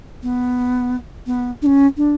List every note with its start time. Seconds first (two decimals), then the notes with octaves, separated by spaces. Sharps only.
0.23 B3
1.27 B3
1.62 D4
1.66 C#4
1.97 D4